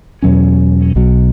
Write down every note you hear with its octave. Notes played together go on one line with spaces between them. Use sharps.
E2 B2 F#3 C#4
B1 B2 F#3